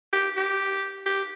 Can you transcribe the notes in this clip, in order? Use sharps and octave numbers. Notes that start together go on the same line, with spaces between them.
G4
G4
G4